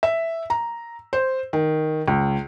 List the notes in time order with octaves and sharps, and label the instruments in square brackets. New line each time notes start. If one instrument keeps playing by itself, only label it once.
[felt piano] E5
A#5
C5
D#3
C#2